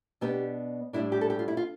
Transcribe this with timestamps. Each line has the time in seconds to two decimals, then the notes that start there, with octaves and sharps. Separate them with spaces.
0.21 B2 B3 D4 G4
0.93 A2 G3 D4 E4
1.12 G4
1.21 A4
1.30 G4
1.39 F4
1.48 E4
1.57 F4